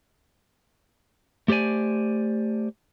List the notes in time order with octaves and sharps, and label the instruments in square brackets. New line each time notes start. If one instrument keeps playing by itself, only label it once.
[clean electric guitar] A3 G4 C5 D5 G#5